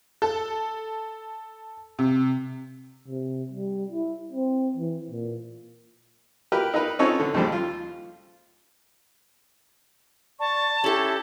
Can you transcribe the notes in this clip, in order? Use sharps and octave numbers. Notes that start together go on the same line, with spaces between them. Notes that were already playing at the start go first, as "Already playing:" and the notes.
A4
C3
C3
G3
E4
C4
E3
A#2
G4 A#4 B4
D#4 A#4 B4
C4 C#4 D#4 F4 A4 C#5
D3
D#2 C#3 F3 G3
F4
D5 A5 C#6
C#4 E4 G4 A4